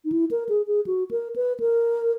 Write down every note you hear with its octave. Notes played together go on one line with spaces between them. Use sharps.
D#4
E4
A#4
G#4
G#4
F#4
A#4
B4
A#4